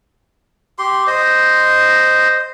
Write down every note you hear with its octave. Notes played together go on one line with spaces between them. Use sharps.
G4 C6
C5 D#5